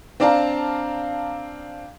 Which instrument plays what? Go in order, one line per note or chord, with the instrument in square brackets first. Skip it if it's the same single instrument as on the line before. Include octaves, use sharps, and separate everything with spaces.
[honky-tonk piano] C4 D4 D5 F5 A5 A#5